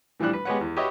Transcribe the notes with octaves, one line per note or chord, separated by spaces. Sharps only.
A2 E3 F3 G3 D4 F#6
B4
G#3 B3 G4 B4 C#5 F#5
E2
F#4 G4 B4 C#5 D#5 E5